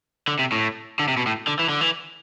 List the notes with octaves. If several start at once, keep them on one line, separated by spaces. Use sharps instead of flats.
D3
C3
A2
D3
C3
B2
A2
D3
E3
D3
E3